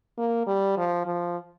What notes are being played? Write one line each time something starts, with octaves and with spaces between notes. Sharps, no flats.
A#3
G3
F3
F3